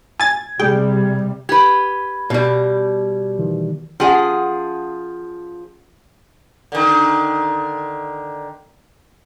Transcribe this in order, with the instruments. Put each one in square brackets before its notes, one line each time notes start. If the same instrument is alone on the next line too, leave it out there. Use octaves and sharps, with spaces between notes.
[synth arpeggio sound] G#5 A6 [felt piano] G#6
[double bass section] C3 G3 [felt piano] G#4 [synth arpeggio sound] G5
[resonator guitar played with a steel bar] G4 B4 [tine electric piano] G#6
[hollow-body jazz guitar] B2 G3
[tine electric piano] D#3 E3
[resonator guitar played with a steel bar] F3 G#4 [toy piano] C#4 F#5
[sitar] D3 D#3